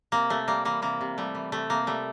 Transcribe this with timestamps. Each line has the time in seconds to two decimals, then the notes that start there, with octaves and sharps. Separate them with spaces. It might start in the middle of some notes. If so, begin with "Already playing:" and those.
0.12 C3 A#3
0.30 C3 A3
0.48 G3 A#3
0.65 E3 A#3
0.82 C3 A#3
1.01 C3
1.18 G3 A3
1.35 E3
1.52 C3 A3
1.70 C3 A#3
1.87 G3 A3